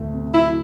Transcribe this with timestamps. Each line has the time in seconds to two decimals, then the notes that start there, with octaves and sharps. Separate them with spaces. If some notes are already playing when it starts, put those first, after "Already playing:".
Already playing: D2 A3
0.12 C3
0.34 F#3 E4